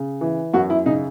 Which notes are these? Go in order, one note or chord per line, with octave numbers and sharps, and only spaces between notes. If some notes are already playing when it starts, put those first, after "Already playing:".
Already playing: C#3
E3
F#2 F#4
E4
C#3 D#4